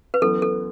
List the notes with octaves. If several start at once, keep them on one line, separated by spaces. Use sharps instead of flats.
B4
F#2 E3 B3 A4
A4